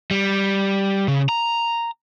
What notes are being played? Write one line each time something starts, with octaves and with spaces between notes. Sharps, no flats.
G3
C#3
A#5